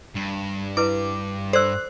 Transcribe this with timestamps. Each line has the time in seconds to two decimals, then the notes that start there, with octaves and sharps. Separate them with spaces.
0.15 G2
0.77 E4 B4 D6
1.53 A4 C5 D5 E6 F#6